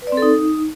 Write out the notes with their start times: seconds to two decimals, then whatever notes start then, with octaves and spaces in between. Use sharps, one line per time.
0.02 B4
0.07 D5
0.12 C4
0.17 A4
0.22 D#4